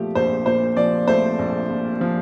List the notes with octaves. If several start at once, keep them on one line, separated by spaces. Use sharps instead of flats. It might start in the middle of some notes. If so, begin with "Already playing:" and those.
Already playing: A#2 F3 A3 G4
A#1 C5
A#2 C5
F3 D5
A3 C5
A#1
A#2
F3